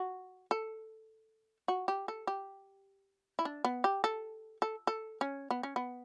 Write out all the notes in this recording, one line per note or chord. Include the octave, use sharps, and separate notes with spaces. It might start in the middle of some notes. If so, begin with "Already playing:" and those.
Already playing: F#4
A4
F#4
G4
A4
G4
E4
D4
B3
G4
A4
A4
A4
C#4
B3
C#4
B3